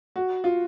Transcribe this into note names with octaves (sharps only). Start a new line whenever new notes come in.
F#4
F4